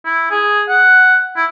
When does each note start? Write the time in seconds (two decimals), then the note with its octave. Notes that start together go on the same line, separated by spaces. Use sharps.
0.05 E4
0.31 G#4
0.69 F#5
1.37 E4